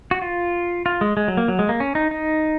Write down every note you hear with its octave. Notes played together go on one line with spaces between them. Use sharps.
F#4
F4
F4
G#3
G#3
F#3
A#3
F#3
G#3
A#3
C#4
D#4
D#4